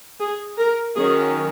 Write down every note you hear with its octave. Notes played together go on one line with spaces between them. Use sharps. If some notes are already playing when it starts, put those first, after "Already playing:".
G#4
A#4
D#3 F#3 C#4 G#4